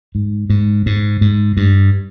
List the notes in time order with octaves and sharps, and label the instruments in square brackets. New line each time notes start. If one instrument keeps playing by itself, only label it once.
[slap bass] G#2
G#2
G#2
G#2
G2